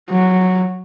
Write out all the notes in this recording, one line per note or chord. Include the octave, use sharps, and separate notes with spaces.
F#3